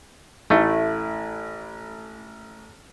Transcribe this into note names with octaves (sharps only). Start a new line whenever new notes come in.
A1 A3 E4